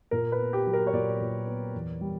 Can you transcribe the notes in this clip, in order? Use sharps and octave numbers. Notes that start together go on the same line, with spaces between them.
A#2 A#4
B4
B3
G4
F#3
A#4
C#5
A#2 D5
A#2
B3
E2
G3